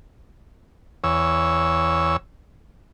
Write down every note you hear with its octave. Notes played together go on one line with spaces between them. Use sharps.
E2 C#5 E6